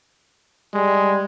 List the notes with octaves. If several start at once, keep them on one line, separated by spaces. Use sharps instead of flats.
G3 G#3